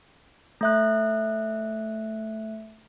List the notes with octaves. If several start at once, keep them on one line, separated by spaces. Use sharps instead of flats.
A3 E5 F#6